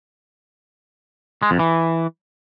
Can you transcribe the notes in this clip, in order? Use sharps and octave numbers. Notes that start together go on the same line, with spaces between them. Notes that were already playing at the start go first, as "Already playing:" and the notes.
G#3
F2
E3